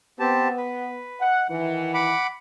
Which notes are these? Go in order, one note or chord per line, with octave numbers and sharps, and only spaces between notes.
B3 C4 G4 A5
B4
D#5 F#5
D#3 E3 F#5
F#5 B5 D6